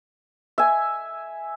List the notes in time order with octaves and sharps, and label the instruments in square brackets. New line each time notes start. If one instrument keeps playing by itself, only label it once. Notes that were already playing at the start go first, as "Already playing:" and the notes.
[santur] E5 G#5